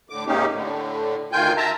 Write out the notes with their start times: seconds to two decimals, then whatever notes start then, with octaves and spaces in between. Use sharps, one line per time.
0.10 A2 D3 D6
0.27 G#2 C3 A#3 C#4 D#4 G4
0.52 A2 D3
1.32 D2 D#3 F4 G5 G#5 G6
1.57 E5 A5 A#5